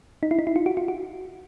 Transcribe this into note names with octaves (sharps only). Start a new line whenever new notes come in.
D#4
E4
D#4
E4
F4
F#4
F4
F#4